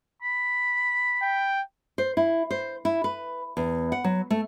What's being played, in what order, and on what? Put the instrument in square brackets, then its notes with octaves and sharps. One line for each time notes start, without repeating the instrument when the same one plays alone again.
[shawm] B5
[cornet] G5
[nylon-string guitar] C5
E4
C5
E4
B4
E2
F#5
F#3
A3